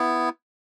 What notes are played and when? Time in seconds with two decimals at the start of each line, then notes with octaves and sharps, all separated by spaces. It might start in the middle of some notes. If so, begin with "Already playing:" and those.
Already playing: B3 E4